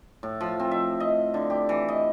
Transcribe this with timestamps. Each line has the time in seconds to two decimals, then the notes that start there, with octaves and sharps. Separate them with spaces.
0.23 A2
0.41 F3
0.60 C4
0.71 E5
1.00 D#5
1.34 D3
1.50 G4
1.69 E3
1.88 D#5